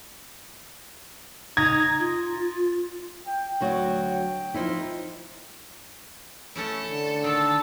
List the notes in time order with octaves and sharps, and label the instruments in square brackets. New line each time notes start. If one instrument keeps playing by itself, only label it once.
[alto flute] D#4 [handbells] A#5 D#6 A#6 [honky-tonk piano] G#6
[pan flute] F4
[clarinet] G5
[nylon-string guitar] D2 F#3 F#4
F3 D#4 E4
[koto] A3 C#4 E4 [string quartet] A4
[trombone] D3
[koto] D#3 [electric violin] A5 E6